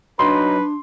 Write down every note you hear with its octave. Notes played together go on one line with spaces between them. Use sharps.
F#3 D4 D#4 B4 C6